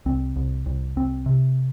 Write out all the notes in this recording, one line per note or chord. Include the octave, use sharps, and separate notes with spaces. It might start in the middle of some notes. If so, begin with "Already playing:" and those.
C2 C4
C2
C2
C2 C4
C3